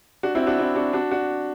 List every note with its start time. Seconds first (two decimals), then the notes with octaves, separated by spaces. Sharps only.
0.23 D4 F#4
0.35 C4 E4
0.47 D4 F#4
0.59 C4 E4
0.75 D4 F#4
0.93 D4 F#4
1.11 D4 F#4